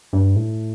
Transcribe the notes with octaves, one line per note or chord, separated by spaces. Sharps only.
G2
A2